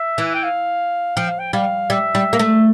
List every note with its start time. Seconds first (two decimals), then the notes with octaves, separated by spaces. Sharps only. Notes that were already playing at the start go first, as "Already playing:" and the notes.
Already playing: E5
0.18 E3
0.35 G5
0.44 F5
1.16 F3 G5
1.28 F5
1.39 G5
1.53 G3 F5
1.90 G3 E5
2.15 G3
2.33 A#3
2.39 A3